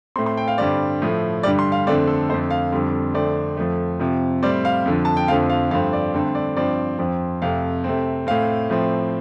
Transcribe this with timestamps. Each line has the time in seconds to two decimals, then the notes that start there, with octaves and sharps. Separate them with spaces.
0.16 A2 A3 C4 C6
0.26 C6
0.37 G5
0.48 F5
0.58 G2 D3 G3 C4 D5
1.02 A2 F3 A3
1.43 G2 D3 G3 D5
1.59 C6
1.72 F5
1.87 F2 D3 A3 C4 D5
2.07 A4
2.29 F2 D3 A3 C5
2.50 F5
2.72 F2 D3 G3 C4
3.14 F2 D3 A3 C4 D5
3.57 F2 F3 A3
4.00 F2 C3 F3
4.43 A2 G3 C4 D5
4.65 F5
4.86 F2 D3 F3
5.05 A5
5.17 G5
5.28 F2 D3 F3 A3 C4 F5
5.50 F5
5.71 G2 F3 A3 C4 F5
5.93 D5
6.14 G2 D3 A3 C4 A4
6.35 D5
6.56 G2 F3 C4 D5
6.99 F2 F3 C4
7.42 F2 C3 A3 F5
7.84 C3 A3 C4
8.27 A2 A3 C4 F5
8.70 A2 F3 A3 C4